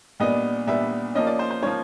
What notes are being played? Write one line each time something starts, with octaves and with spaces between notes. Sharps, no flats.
A#2 G3 B3 D4 D#5
A#2 G3 B3 D4 E5
F3 A#3 C#4 D#5
D5
C5
C5
F3 A#3 C#4 C#5